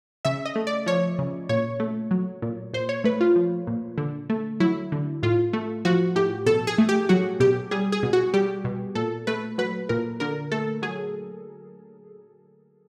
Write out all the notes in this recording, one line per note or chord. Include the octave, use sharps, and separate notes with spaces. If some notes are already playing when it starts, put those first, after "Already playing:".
C#3 E5
D#5
A3
D5
F3 C#5
C#3
A#2 C#5
A3
F#3
A#2
A#2 C5
C#5
A3 B4
F4
F3
A#2
D3
A3
F#3 E4
D3
A2 F4
A3
F3 F#4
A2 G4
B2 A4
G#4
A3
G4
F#3 F#4
B2 G4
G3 G#4
G#4
B2
F#4
G3 G4
B2
A#2 A4
A3 B4
F#3 B4
A#2 A#4
D3 A#4
A3 A4
F#3 G#4